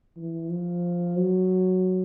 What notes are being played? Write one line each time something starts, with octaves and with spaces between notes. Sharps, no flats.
E3
F3
F#3